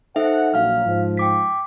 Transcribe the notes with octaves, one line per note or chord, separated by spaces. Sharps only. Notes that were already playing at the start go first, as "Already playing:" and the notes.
D#4 A4 C5 E5 F#5
A#1 F#3 F5 F6
G#2 F3
G5 D6 B6